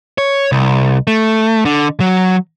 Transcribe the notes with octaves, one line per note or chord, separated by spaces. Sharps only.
C#5
C2
A3
D3
F#3